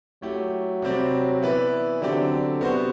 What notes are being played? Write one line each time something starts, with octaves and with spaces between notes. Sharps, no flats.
F#3 A3 E4 G4
C3 G3 C4 G4 D5
E3 B3 E4 B4 D5
D3 F#3 C4 G4 D5
C3 B3 F#4 C5